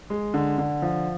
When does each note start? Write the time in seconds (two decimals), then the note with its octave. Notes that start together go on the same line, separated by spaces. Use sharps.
0.10 G#3
0.34 D3
0.58 D3
0.82 F3